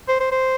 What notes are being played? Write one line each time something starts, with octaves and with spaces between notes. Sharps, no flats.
C5
C5
C5